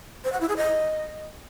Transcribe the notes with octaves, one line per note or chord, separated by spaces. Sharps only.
C5
F#5
E4
G#4
D#5